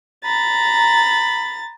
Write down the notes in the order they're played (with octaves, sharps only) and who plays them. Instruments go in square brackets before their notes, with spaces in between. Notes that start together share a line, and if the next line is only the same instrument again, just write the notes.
[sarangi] A#5 [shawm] B5 [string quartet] A6